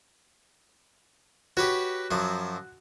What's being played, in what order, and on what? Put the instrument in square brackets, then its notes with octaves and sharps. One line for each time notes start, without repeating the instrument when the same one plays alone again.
[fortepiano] F#4 [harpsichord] G4 B4 C#5
[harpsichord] F#2 F3 F#3